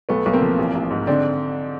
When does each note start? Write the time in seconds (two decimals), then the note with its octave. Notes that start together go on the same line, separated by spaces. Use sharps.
0.09 B1 A3 B3
0.26 B1
0.33 A#3 C4
0.42 F3
0.58 A1
0.75 A1
0.90 G#2
1.07 D3 C4 D4